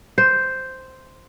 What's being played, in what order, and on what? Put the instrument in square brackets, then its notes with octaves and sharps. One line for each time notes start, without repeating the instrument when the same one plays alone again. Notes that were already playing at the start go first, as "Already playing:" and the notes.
[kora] C5